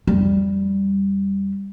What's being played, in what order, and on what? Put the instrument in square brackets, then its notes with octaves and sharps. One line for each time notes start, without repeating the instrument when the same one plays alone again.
[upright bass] F2 G3